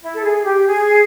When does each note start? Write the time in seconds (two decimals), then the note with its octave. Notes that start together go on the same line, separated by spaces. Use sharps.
0.02 E4
0.13 A4
0.23 G#4
0.45 G4
0.66 G#4